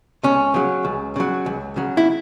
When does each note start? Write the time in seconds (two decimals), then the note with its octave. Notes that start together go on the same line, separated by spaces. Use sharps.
0.24 C#2 C#4
0.54 C#3 F#3
0.85 C#2
1.16 C#3 F#3
1.46 C#2
1.76 C#3 F#3
1.97 E4